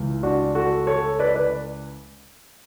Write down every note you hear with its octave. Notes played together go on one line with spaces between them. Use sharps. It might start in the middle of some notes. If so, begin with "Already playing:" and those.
Already playing: C#2 C#3 E3
D4 F#4
F#4 A4
A4 C#5
B4 D5
B4 D5